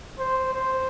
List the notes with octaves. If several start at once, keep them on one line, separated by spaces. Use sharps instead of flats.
C5
C5